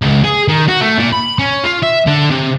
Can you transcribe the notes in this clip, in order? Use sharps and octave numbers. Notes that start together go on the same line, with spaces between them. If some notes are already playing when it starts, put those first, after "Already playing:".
C#2
G#4
D#3
F#4
A3
A#2
B5
C#4
F4
E5
D3
C3